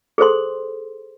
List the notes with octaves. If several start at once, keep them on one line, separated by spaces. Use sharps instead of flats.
G#4 A4 C5 C6